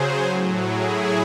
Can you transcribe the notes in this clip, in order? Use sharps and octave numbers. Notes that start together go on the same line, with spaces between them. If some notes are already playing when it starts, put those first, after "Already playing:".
Already playing: C#3 F#3 G#4 C5
A2 F#3
E4 G#4